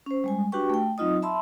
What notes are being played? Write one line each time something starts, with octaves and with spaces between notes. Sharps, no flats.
C#4 C5
G3 G#3 G#5
D4 F#4 G4 B4 G5 C#6
A3 G5
F#3 C4 D#4 F4 D#5 D#6
E5 A5 B5 C6 E6